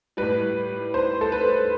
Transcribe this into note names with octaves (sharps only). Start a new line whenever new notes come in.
A2 G3 B4
C5
A4
B4